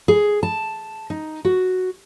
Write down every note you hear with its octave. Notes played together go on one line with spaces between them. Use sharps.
G#4
A5
D#4
F#4